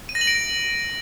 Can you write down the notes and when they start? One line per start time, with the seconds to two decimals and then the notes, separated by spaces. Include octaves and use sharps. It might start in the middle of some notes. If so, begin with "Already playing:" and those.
0.09 D#7
0.15 A#6
0.21 F#7
0.27 D7